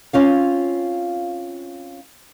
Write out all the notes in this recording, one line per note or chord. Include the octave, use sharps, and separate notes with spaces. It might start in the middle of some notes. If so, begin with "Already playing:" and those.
C4 C#4 F4 F5